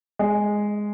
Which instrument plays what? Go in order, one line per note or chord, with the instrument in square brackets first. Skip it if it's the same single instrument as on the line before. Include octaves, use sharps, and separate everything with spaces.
[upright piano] G#3 G#4